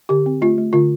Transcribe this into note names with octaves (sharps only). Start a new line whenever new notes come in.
D3 G4
C4
A3 F4
A3
D3 F4